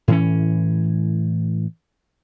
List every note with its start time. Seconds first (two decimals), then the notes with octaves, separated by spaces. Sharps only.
0.08 A2 E3 C#4